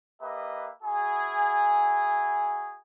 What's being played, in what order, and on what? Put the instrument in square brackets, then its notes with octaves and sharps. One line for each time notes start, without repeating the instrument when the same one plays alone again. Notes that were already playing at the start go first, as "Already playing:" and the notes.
[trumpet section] A#3 G4 B4 D#5 E5
E4 F#4 G#4